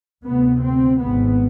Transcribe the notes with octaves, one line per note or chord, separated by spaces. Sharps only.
D2 C3 B3
C4
G#1 G#2 B3